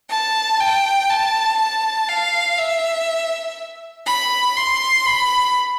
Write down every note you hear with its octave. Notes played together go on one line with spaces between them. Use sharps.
A5
G5
A5
A5
F5
E5
B5
C6
B5